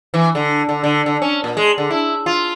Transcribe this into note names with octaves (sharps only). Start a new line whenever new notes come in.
E3
D3
D3
D3
D3
C#4
A#2
G#3
D3
E4
F4